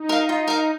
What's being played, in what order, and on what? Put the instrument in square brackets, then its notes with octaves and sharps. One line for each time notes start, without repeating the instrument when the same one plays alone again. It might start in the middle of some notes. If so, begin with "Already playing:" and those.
Already playing: [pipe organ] D#4
[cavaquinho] A#4 F5
F4
A#4 F5